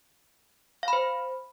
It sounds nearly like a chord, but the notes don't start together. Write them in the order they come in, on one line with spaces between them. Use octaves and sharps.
F5 B5 C5